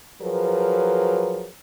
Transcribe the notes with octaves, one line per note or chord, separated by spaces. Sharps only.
F3 F#3 G#4 A#4 B4